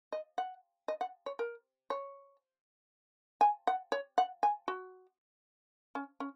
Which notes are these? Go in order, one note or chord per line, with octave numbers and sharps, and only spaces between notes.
D#5
F#5
D#5
F#5
C#5
A#4
C#5
G#5
F#5
C#5
F#5
G#5
F#4
C#4
C#4